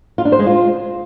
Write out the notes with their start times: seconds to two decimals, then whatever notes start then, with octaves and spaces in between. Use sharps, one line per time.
0.18 F4
0.25 D4
0.32 C5
0.39 G#3
0.46 F4